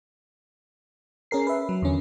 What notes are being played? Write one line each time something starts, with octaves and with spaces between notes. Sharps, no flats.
C#4 G#4 A#4 C7
B4 E5
F#3
E2 D3 C#4